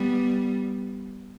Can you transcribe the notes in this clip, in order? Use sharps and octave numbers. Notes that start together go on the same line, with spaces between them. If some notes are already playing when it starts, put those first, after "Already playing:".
Already playing: G3 B3